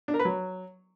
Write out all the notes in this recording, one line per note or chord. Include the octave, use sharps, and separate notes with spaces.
D4
A#4
B4
F#3